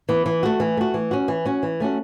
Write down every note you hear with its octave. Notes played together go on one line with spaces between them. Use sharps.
E3 B3
E3
A3 F#4
E3
A3 F#4
E3
C#4 F#4
E3
C#4 F#4
E3
A3 C#4 F#4